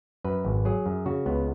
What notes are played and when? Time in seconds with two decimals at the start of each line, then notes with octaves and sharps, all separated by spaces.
0.24 F#2 B4
0.45 G#1
0.65 F#3 G#4
0.86 F#2
1.06 C#3 F#4
1.26 C#2 B3